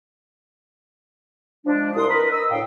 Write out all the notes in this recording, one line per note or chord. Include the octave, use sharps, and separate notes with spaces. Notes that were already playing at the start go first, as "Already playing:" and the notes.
F3 G#3 D4
C2 C6 D#6
A#4 B4
D#5 D#6 E6
D2 A2 F5 G5